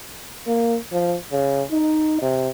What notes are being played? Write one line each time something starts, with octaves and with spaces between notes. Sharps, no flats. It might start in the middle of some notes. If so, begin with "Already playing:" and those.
A#3
F3
C#3
D#4
C3